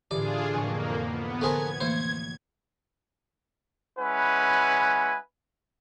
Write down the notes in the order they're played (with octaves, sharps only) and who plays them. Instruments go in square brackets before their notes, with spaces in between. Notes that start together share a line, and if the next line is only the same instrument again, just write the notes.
[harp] A2 D3 E3 [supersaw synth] D4 F4 G#4 [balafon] G4 [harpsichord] D5
[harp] F1 A2 C#6 [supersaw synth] F2 A#3 [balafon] G#5
[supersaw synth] B3
[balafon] D3 C5 C6 [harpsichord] A3 G#4 A#4 [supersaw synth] G#6
[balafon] E3 A3 A#3 [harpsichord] C5 [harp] C#5 C#7
[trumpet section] G#3 C#4 E4 B4 F#5 G#5